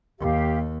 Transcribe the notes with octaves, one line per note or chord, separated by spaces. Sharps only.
D#2 G4 F5